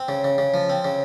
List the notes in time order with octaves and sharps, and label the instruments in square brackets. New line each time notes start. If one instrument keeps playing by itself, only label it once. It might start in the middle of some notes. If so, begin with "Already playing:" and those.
Already playing: [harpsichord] C4
C#3
C#3
C#3
F3
C4
C#3